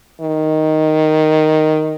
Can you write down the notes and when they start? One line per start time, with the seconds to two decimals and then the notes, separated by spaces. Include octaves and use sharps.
0.21 D#3